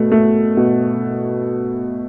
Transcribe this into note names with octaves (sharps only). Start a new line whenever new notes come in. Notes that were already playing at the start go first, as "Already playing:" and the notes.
Already playing: B2 A3
A3
B2